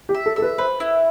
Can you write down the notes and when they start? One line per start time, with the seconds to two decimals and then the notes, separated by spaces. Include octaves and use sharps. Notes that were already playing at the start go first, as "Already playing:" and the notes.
0.09 G4
0.14 E5
0.26 A4
0.36 A4 E5
0.42 B4
0.58 B4 C5
0.80 E4